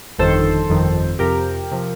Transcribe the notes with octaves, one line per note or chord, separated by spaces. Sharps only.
G1 F2 D#3 A4 C5
G1 F2 D#3
F2 C3 F3 G4 A#4
C3 F3